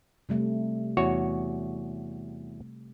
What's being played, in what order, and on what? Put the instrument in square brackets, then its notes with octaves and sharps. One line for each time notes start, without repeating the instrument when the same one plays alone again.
[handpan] C3 G3 A3
[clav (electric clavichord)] E2 F#4 C#5